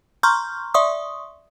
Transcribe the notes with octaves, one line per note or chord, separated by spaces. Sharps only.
A#5 C6 C#6 F6 G6
D5 E5 C6 C#6 D#6